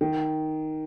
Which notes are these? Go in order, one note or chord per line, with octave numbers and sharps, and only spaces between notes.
D#3